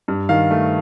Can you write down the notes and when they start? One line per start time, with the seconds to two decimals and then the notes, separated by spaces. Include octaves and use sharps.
0.08 G2
0.29 D#3 F5
0.51 A3